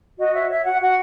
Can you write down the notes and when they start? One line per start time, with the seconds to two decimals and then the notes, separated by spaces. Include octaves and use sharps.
0.19 F#4 D#5
0.33 C#5 E5
0.49 C#5 E5
0.64 F#4 F#5
0.79 F#4 F#5